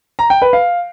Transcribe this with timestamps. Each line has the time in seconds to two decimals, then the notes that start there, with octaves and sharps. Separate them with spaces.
0.19 A#5
0.30 G5
0.42 B4
0.53 F5